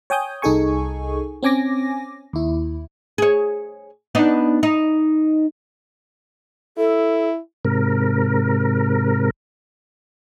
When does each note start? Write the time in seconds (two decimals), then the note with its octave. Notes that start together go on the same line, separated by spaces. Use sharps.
0.10 C#5 G5 G#5 D#6 G6
0.42 C2 D#4 G#4 A4 G#5 C#6
1.43 C4 C#4 G#5 D6 A#6
2.33 D#2 E4
3.18 G#4 C#5
4.15 B3 D4 D#4
4.63 D#4
6.77 E4 A4
7.65 G#2 C3 A#4